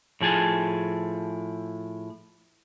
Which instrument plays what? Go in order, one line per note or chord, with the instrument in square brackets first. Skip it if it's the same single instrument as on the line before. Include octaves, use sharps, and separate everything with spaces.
[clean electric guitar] A2 F3 G#4 G#5 A5